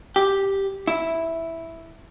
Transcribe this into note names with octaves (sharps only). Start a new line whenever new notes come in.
G4
E4